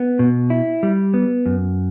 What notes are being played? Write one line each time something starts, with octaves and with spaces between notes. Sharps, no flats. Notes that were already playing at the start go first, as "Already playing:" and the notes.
Already playing: B3
B2
E4
G3
B3
F#2